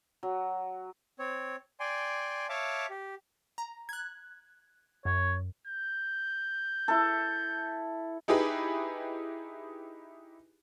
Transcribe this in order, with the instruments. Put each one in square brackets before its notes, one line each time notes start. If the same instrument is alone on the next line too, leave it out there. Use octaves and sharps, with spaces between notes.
[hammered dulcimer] F#3
[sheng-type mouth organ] C4 C#5
D5 G5 G#5 C6
C#5 E5 F5 A5 C#6 D6
G4
[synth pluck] A#5
F#6 G#6
[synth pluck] F#2 [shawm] C#5
[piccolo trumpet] G6
[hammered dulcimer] E4 A4
[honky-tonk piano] D#4 E4 G4 G#4 B4 B5